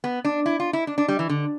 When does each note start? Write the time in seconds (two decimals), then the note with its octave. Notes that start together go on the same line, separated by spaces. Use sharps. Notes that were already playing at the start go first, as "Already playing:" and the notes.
0.04 B3
0.25 D4
0.46 E4
0.60 F4
0.73 E4
0.87 D4
0.98 D4
1.08 G3
1.19 E3
1.29 D3